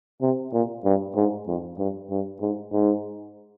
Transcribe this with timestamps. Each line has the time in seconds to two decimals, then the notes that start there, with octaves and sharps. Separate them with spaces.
0.22 C3
0.53 A#2
0.85 G2
1.16 G#2
1.48 F2
1.79 G2
2.10 G2
2.41 G#2
2.72 G#2